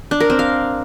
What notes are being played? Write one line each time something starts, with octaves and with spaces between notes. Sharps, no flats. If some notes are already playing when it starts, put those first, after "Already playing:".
D4
A#4
C4
F5